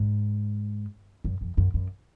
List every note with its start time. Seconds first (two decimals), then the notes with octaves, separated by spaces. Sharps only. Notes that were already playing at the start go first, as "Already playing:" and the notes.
Already playing: G#2
1.24 F#2
1.41 F2
1.57 F#2
1.74 F#2